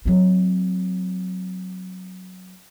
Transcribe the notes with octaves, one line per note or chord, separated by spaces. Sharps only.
F#3 C4